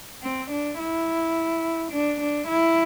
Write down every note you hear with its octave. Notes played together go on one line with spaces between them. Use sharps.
C4
D4
E4
D4
D4
E4